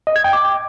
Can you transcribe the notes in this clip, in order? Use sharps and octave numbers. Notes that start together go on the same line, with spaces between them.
D#5
G#6
G5
D6